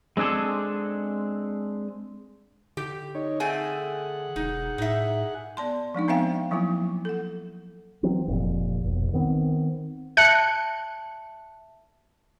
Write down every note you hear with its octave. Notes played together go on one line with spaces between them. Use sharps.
G#3 C4 D4 G#4 A4
D3 G4
D#4 C#5
A3 C4 G#4 F#5 G#5
E1 D#4
A2 D#4 E5
B3 D5 A5 C6
F3 G#3 D4 D#4
B3 C4 C5 E5 F5 G5
F3 F#3 A#3 E4
A4 F#5
E3 F#3 C4
F1 F2 A#2
F1 B1
D#3 B3 C4
E5 A5 F#6 C#7